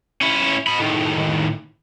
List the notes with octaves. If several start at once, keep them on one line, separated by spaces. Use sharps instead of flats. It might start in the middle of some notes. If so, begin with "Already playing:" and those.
C#4 E4
D#5 B5
A2 D#3